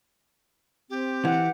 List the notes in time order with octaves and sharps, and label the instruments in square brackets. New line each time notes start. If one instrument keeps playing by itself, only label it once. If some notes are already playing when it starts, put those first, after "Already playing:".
[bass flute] C4 [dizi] G4
[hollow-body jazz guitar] E3 [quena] F#5